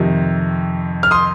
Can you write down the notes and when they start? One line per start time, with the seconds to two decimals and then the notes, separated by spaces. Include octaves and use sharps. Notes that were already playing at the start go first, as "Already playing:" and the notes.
Already playing: F2 C3 D#3
1.03 F6
1.11 C6 D#6